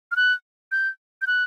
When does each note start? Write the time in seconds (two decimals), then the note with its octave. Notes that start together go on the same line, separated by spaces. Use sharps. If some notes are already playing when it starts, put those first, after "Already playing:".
0.11 F6
0.16 F#6
0.72 G6
1.22 G6
1.27 F#6